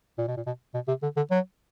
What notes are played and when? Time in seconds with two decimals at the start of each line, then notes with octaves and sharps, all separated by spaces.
0.18 A#2
0.27 B2
0.37 A#2
0.46 B2
0.74 B2
0.88 C3
1.03 D3
1.16 D3
1.31 F#3